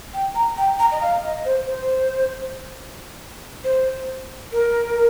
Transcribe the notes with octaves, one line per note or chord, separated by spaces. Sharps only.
G5
A#5
G5
A#5
D#5
F5
D#5
C5
C5
C5
A#4